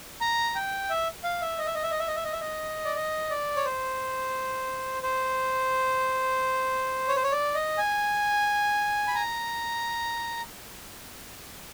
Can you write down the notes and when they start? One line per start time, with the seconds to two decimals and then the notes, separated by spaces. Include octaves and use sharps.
0.21 A#5
0.55 G5
0.90 E5
1.24 F5
1.41 E5
1.58 D#5
1.66 E5
1.75 D#5
1.83 E5
1.91 D#5
1.99 E5
2.07 D#5
2.15 E5
2.24 D#5
2.32 E5
2.41 D#5
2.85 D5
2.96 D#5
3.30 D5
3.56 C#5
3.65 C5
5.03 C5
7.08 C#5
7.16 C5
7.23 C#5
7.32 D5
7.55 D#5
7.78 G#5
9.07 B5
9.15 A#5